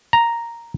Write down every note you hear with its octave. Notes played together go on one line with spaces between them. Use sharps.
A#5